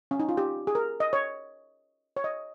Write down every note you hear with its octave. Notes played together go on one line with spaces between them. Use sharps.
C#4
D#4
F4
G4
G#4
A#4
D#5
C#5
C#5
D#5